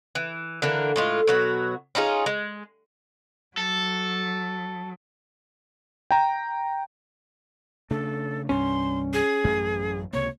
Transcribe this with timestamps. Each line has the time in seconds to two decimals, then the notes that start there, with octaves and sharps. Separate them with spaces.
0.15 E3
0.62 D3 E3 A#3
0.96 A2 G#3 F4
1.28 B2 F#3 F#4
1.95 C#4 D#4 F4 G#4
2.26 G#3
3.57 F#3 A4
6.11 G5 A#5
7.91 C#3 A3 D4 A4
8.49 C2 G2 C#4 C6
9.13 G#4
9.44 A1 F#2 A3
10.13 C#2 C3 A#3 C#5